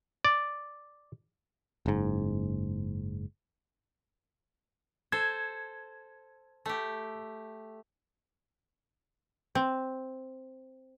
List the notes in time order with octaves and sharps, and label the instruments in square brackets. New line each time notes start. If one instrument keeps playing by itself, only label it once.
[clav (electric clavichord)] D5
[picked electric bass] F#1 G#2
[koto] A4 C5 [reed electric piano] G#6
[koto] A3 G4
C4